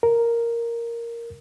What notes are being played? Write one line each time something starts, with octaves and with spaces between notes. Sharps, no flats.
A#4